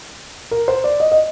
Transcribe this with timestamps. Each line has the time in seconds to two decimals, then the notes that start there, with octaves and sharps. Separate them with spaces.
0.51 A#4
0.68 C5
0.84 D5
1.00 D#5
1.12 D#5